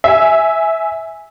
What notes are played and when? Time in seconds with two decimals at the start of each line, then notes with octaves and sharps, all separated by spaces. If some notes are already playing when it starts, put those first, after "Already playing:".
0.04 E5 G#5